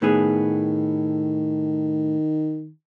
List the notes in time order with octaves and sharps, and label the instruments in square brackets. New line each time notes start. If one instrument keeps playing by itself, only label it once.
[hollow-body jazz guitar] A2 B3 G#4 [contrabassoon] D#3